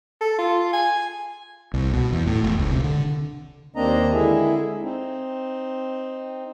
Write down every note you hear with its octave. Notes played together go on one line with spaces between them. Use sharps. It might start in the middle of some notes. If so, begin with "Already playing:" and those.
A4
F4
G#5
C2
B2
E2
A2
E1
C#2
C3
D3
D#2 A#3 C4 D4 D#5 A#5
D3 G#3 E4 G#4 E5
C4 D#4